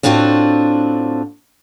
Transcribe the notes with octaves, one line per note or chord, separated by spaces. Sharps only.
A2 C4 D4 F4 F#4